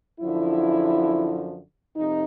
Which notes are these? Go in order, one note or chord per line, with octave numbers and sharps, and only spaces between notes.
F#2 D3 F3 E4
F2 C3 D#4